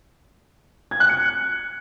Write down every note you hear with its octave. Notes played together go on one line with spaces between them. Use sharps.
G#6
F#6
C#7